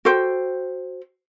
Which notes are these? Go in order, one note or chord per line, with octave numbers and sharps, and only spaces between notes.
F#4 A4 C5 G5